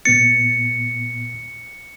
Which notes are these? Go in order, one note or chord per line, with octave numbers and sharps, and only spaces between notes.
A#2 B3 A6 C#7